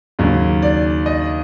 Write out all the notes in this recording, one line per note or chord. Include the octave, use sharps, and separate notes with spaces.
D#2 C#3 F#3
D5
D#5